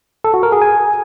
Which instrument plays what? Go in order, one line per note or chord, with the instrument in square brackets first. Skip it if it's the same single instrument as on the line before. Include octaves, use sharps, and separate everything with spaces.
[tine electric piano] A4
F#4
A#4
G#4
G#5